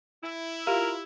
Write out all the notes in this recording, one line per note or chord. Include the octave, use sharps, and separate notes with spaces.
E4
F4 G4 A#4